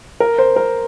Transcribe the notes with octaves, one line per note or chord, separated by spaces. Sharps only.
A#4
C5
A#4